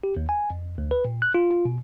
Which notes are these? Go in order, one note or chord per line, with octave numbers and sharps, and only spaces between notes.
G4
D#2
G#5
F2
D2
B4
A#2
F#6
F4
F4
B2